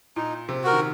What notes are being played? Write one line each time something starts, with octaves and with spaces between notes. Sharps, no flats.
A#2 D#4
C3
F#4 A#4
D#3